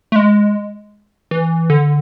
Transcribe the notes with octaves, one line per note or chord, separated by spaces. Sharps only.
A3
G#3
E3
D3